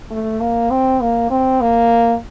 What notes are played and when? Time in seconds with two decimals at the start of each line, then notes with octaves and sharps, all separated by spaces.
0.11 A3
0.40 A#3
0.70 C4
1.01 A#3
1.30 C4
1.61 A#3